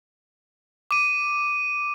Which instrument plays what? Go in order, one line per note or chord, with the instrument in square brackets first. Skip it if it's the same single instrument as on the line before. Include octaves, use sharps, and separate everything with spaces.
[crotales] D6 D#7